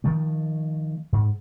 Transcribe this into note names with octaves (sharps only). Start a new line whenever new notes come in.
D#3 F3 A3
G#2